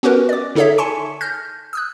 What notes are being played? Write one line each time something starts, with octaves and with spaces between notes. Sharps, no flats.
B3 C#4 F#4 G4 A#4 B4
D5 D6
D3 D#4 G#4 A4 C#5 E5
G#5 A5 C6 C#6 C#7
F6 G6 A#6
D#6 E6 F#6